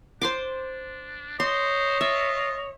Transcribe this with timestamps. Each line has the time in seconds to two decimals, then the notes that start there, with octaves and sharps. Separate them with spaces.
0.22 D4 C5 C6 D6
1.40 C5 C#5 D#5 C6
2.01 F4 E5